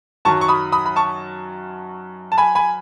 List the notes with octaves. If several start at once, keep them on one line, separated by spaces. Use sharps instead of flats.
F#2 D#3 F#3 A5 C#6
C#6
B5 D#6
B5 D#6
B5
A5 C#6
A5
G#5 B5
G#5 B5